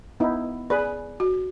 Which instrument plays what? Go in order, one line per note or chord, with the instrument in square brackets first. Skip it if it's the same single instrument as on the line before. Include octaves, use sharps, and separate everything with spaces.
[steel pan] B3 D#4 E4
[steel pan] G#4 B4 [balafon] D5
[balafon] F#4